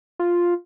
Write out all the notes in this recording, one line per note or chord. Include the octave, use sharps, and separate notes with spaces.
F4